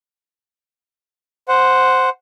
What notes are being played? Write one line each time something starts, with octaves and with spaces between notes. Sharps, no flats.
C5 F#5